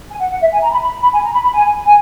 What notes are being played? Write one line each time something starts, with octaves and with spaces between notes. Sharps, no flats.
G#5
F#5
F#5
E5
G#5
A#5
B5
B5
B5
G#5
A#5
B5
B5
G#5
G#5